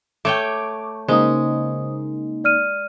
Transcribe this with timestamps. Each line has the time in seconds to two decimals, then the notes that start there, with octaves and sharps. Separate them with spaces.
0.25 A3 C#5 G5 D6
1.09 C#3 G#3 A#3 D#4 C5 D#6
2.44 D5 F6 D#7